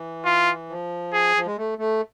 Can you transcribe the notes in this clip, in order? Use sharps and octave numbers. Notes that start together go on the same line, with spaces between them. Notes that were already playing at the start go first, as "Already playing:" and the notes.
Already playing: E3
F4
F3
G#4
F3
G#3
A3
A3